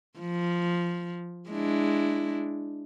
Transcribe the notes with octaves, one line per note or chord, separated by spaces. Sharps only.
F3
G#3 D4 E4